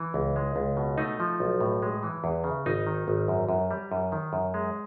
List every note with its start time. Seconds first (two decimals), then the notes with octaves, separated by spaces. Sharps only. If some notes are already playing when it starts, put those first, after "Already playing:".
Already playing: E3
0.14 C#2
0.36 G#3
0.56 C#2
0.77 B2
0.98 A3 D#4
1.20 F3
1.40 B1
1.60 A2
1.82 G#3
2.03 E3
2.24 E2
2.44 C#3
2.66 G#1 D#4
2.87 D#3
3.08 G#1
3.28 F#2
3.49 F#2
3.71 G3
3.92 F#2
4.12 D#3
4.33 F#2
4.54 G#3